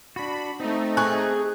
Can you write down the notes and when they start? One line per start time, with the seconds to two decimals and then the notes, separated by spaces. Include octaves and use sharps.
0.16 D4 F#4 B5
0.60 A3 C4 D#4
0.97 G#4 C#6 F#6